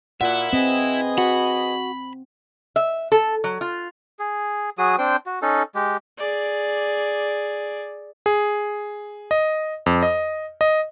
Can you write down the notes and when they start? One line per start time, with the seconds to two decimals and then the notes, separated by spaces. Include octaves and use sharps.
0.21 A#2 E4 E5 F#5
0.53 C4 G#4 B4 D#5
1.18 F#4 B5
2.76 E5
3.12 A4
3.44 F#3
3.61 F4
4.19 G#4
4.78 F#3 F#4 G#4 D#6
4.98 C4 D4 C5 G5
5.26 F#4
5.42 C#4 D#4 A4
5.75 G#3 G4
6.19 G#4 D5
8.26 G#4
9.31 D#5
9.86 F2
10.03 D#5
10.61 D#5